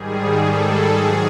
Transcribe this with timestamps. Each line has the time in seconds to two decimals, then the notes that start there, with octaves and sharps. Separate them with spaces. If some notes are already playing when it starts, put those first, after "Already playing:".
Already playing: G#2 D#3 G3 G#4
0.44 A4
0.97 G#2 D#3 F#3 G#4